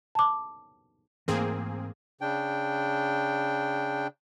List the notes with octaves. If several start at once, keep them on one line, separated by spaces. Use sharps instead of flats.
A5 D6
G#2 E3 A3 A#3 C4 G#4
C#3 D4 G5